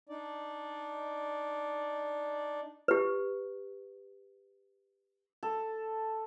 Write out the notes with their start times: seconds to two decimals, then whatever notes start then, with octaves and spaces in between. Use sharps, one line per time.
0.09 D4 D#4 D5
2.88 G4 B4
5.43 A4